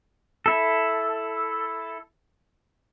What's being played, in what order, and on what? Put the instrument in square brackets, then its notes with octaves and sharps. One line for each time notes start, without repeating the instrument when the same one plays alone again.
[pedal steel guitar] E4 A4